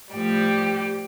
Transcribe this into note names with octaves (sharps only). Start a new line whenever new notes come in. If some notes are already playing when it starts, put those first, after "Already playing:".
A2 F3 G3 G4